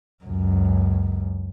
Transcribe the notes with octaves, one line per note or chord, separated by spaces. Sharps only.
C#2 F#2